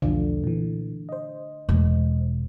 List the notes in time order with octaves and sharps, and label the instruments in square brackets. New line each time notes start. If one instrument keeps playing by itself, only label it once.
[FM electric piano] B1 E2 F3 [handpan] D3
[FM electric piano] A#2 E3
C5 D#5
[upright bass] E1